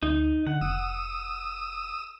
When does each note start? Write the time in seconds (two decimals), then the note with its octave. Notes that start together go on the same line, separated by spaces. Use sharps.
0.03 D2 D#4
0.47 D3 F#5
0.61 F1 D#6 E6